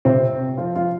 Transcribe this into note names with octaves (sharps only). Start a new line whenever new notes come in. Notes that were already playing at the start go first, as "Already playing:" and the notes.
C3 C4
F3 F4
F3 F4